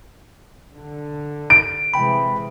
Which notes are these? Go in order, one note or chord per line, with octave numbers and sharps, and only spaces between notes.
D3
D7
C3 E3 G#3 G5 B5